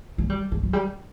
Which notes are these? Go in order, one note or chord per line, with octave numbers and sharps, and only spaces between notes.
A#3
G3
A#3
F#3
G3